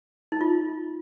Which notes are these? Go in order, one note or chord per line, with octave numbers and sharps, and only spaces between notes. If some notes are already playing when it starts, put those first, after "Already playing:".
D#4
F4